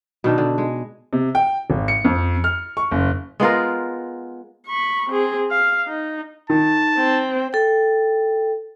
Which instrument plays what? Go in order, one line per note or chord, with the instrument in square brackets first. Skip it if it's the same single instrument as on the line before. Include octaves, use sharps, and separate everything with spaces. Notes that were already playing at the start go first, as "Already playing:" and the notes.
[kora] B2 D#3 D4
D3
G#3
[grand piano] C3
G5
G#1
C#7
F2
F6
C#6
F#1
[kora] G#3 B3 F4 A#4
[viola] B5 C#6
C4 G#4
F5
D#4
[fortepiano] D#3 [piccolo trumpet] A5
[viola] C4
[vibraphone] A4 G5